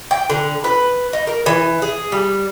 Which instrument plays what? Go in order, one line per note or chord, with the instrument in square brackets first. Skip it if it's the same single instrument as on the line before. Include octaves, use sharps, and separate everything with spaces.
[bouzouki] G5
D3
B4
D#4
A#4
E3
G#4
G3